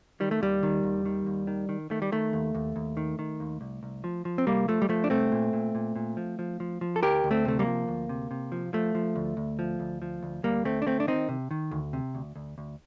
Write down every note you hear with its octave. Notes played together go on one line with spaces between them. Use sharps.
D#3 G3
A3
D#2 G3
D#3
D#2
D#3
D#2
D#3
D#3
D#3 A3
G3
D#3 A3
D#2
D#2
D#2
D#3
D#3
D#2
C2
C2
F3
F3
C4
C2 G3 A#3
F3 A3
G3
F3 A3
D4
C2 A3 C4
A#2
A#2
A#2
A#2
F3
F3
F3
F3
A4
D2 G4 A#4
D2
A3 C4
C3 A3
G3 A#3
F3
D2
C3
C3
F3
F3 A3
F3
D2
D2
F3
D2
F3
D2
D2 G3 A#3
D2 A3 C4
D4
D2 A3 C4
D4
D#3 C4 D#4
C3
D#3
D2
C3
D2
D2
D2